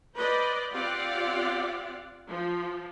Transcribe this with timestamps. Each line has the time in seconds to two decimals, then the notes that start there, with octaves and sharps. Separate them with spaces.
0.16 B4 C5 D5 D#5
0.74 C4 F4 G4 D5 F5 F#5
2.29 F3